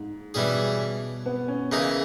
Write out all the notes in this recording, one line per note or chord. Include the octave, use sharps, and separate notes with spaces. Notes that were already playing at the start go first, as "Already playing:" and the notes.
Already playing: G#2
B2 E3 G3 C#4 G#4
B3
C#4
C#3 E3 A#3 C#4 D#4 G#4